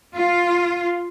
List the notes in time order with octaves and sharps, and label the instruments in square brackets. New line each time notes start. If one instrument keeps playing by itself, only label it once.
[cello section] F4